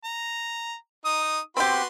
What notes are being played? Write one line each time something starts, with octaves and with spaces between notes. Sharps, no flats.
A#5
D#4 D#6
B3 C4 F#4 G4 C6